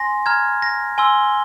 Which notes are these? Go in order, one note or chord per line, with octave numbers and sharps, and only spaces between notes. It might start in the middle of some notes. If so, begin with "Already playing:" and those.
Already playing: G#5 C6 A#6
A#5 F6 G#6
A#6
G#5 C6 E6 G7